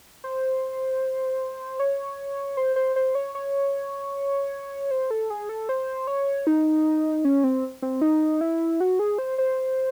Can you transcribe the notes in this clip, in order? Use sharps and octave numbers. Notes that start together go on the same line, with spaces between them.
C5
C#5
C5
C5
C5
C#5
C#5
C5
A4
G#4
A4
C5
C#5
D#4
C#4
C4
C4
D#4
E4
F#4
G#4
C5
C5